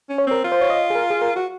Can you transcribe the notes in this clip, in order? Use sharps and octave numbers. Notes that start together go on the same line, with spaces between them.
C#4
C#5
C4 A#4
F4
C5
C#5
D#5
G#4
A#4
G#4
A#4
F#4